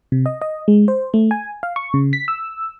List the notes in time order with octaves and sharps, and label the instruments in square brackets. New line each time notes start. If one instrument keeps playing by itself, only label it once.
[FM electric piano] C3
D#5
D#5
G#3
C5
A3
G#5
F5
C#6
C#3
B6
E6